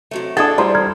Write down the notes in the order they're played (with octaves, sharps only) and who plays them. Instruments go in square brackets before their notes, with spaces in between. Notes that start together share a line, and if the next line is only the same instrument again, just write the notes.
[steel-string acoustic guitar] C3 F#3 A3
[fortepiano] D4 E4 G#4 [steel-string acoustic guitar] A4 A5 [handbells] D#6 G#6 A6
[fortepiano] G3 E4 C5 [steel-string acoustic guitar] F4 [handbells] D5 A#5 C6
[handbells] A#5 F6 G#6